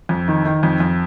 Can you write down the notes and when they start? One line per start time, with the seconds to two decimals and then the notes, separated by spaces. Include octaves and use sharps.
0.09 F2
0.28 D#3
0.45 D#3
0.63 F2
0.80 F2